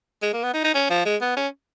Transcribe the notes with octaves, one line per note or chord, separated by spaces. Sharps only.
G#3
A#3
B3
D#4
D#4
C#4
F3
G#3
B3
C#4